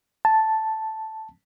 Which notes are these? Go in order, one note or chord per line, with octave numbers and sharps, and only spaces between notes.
A5